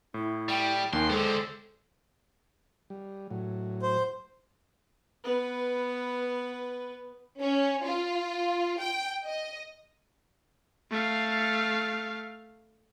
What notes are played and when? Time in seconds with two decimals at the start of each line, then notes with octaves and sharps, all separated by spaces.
0.14 A2 E4
0.49 G3 G5
0.93 D#2 D#3 G#5 C6
1.10 D3 G#3 A4 C5
2.90 G3
3.31 A2 F#3
3.82 C5
5.24 B3 B4
7.40 C#4
7.85 F4
8.80 G5
9.25 D#5
10.90 A3 F5